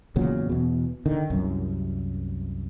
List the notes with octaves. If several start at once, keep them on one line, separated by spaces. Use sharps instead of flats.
E2 A#2 C#3 F#3
E2 B2
D3 D#3
C2 F#2